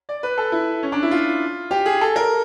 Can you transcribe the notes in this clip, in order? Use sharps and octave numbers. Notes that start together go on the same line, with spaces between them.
D5
B4
A4
E4
C#4
D4
E4
F4
G4
G#4
A4
A#4